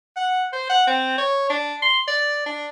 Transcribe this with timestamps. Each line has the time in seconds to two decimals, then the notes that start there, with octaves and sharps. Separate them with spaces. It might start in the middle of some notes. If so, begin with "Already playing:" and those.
0.16 F#5
0.53 C5
0.69 F#5
0.87 C4
1.18 C#5
1.50 D4
1.82 C6
2.08 D5
2.46 D4